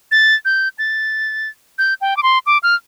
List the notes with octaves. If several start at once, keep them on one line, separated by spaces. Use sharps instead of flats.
A6
G6
A6
G6
G5
D6
C6
D6
F6